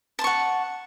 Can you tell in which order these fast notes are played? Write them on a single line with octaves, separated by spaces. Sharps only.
A5 C6 C#6 F#5